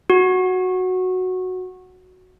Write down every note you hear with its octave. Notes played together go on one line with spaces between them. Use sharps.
F#4